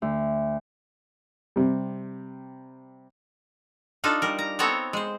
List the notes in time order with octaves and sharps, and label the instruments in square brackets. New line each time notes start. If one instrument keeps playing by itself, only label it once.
[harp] D2
[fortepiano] C3 G3
[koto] D4 D#4 F4 A4
G3 A#4
A#5
B3 C4 A4 C#5 A#5
G#3 C5